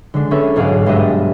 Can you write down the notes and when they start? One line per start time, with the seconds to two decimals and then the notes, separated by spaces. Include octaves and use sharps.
0.14 D3 G#3 D4
0.31 B3 C#4 D4 G#4 A4 E5
0.56 B1 G#2 G#4 F5 D6 F#6
0.86 G2 G#3 D4 G4 D#5 E5